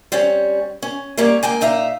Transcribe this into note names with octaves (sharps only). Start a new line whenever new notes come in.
G3 C4 C#4 C#5
C#4
G3 A#3 C#4 C#5
G#2 A#3 G5 G#5
A#2 D#4 E5 F5 A#5